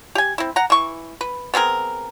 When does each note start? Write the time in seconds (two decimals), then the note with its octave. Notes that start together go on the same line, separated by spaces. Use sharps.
0.15 G4 G#5
0.38 C4 E4
0.56 F#5 A#5
0.70 E3 C#6
1.21 B4
1.54 B3 C4 G#4 A#4